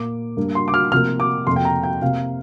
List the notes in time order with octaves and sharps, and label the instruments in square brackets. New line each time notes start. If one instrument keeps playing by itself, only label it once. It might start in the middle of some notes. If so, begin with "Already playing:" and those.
Already playing: [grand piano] A#2 A#3 D6
G2 G3 A#3
C6
D6
F6
C3 F3 A#3 F6
D6
F2 C3 A#3 C6
G5
A#5
G5
C3 A#3 F5